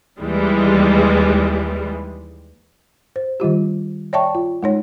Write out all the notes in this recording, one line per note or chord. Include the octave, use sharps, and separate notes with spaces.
D#2 E3 G3 G#3
C5
D#3 G3 F4 G4
C#5 D5 E5 G5 A5 C#6
F4
G#3 D#4 C#5